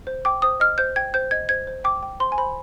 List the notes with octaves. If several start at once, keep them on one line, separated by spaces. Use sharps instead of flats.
C5
G5 D6
C5 D#6
D#5 F6
C5 G6
G5 G#6
C5 G6
D#5 G#6
C5 G#6
C5
G5 D6
G5
C5 C6
G#5
C5 B5